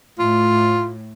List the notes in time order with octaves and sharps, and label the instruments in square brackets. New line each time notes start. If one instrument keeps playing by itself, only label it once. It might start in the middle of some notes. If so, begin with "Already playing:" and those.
[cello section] A2 [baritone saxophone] F4